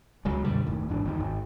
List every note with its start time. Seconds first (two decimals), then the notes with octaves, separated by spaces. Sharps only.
0.25 C#2 C#3 F#3 G#3
0.44 F#2 B2 D3 G3
0.66 F#1 D#2 A2
0.89 G#1 G#2 E3 D4
1.05 G1 E2 D#3
1.20 G#1